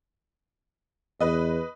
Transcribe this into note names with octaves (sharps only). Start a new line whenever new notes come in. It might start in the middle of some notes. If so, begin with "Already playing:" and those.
E2 B4 D#5